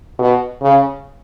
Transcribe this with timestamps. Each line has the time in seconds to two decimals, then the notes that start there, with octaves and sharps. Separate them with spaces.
0.19 B2
0.61 C#3